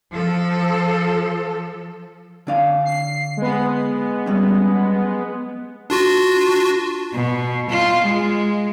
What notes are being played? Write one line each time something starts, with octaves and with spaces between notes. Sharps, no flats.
F3 A4
D3 D4 F5
C7
G#3 B3
F#3 G3 C#4
D4 F4 F#4
B2
F4
G#3